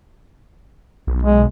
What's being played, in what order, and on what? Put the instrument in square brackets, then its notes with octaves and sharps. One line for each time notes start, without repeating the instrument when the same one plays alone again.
[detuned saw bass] B1
[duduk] G#3